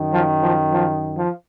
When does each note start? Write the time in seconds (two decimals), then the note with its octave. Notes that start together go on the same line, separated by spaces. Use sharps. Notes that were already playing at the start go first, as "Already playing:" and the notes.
Already playing: F#2 D#3
0.13 F3
0.42 F3
0.71 F3
1.16 F3